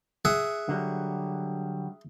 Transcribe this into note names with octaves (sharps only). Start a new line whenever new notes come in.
G#4 E5 F#5
D3 F#3 G3